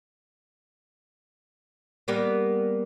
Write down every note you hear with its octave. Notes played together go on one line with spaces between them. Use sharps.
G3 A#3 B3